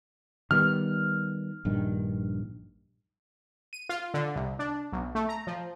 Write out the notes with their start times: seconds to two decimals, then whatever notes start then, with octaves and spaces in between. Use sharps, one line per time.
0.51 D#3 G3 B3 F6
1.65 A#1 G2 D#3
3.73 D#7
3.89 F4
4.14 D3
4.36 C2
4.59 D4
4.93 B1
5.15 A3
5.29 A#5
5.47 F3